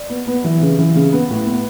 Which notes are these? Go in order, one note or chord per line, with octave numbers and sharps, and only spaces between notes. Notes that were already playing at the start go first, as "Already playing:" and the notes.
Already playing: D5
B3
B3
E3
C#3
E3
C#3
B3
A2
B3